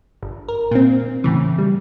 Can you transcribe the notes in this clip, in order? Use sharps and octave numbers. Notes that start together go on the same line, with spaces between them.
G1
A#4
A#2 C4
A2 C#3 E3
G3